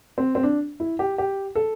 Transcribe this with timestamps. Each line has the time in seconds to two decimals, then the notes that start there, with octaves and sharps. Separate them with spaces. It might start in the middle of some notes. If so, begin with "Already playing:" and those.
0.18 C4
0.35 C4
0.43 D4
0.80 E4
0.99 G4
1.18 G4
1.55 A4